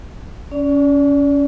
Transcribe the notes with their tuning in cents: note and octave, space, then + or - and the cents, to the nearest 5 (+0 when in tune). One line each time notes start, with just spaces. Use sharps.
C#4 +20 D5 -20